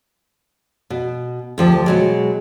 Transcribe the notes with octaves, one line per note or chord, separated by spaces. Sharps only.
B2
D2 F3 G4
B2 F#3 G#3